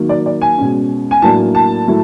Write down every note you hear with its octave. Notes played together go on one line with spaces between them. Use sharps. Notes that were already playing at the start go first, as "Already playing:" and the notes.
Already playing: D#3 F#3 A#3
D5
D5
G#5
B2 G#3 C#4
G#5
A2 F#3 A#3 D4 A5
A5
A2 F#3 A3